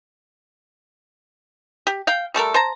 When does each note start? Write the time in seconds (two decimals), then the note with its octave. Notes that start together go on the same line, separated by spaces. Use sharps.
1.87 G4
2.07 F5 G5
2.34 G3 A3 A4 A#4
2.54 C5 A5 A#5